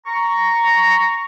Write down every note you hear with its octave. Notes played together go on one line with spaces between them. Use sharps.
A#5 C#6